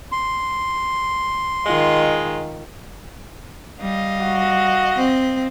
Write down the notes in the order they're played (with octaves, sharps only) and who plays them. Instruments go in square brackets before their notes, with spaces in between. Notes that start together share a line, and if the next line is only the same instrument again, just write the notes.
[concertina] C6
[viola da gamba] D#3 F4 [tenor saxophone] G#3
[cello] G3 [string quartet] D#5 F5
[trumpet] F#4
[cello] C4